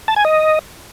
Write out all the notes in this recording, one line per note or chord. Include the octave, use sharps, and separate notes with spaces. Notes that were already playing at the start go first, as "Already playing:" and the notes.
A5
G#5
D#5